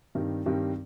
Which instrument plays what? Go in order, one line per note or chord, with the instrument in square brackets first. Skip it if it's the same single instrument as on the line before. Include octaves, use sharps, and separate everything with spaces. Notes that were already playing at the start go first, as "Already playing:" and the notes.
[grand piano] G2 D#3 G3 C4
G2 D#3 G3 C4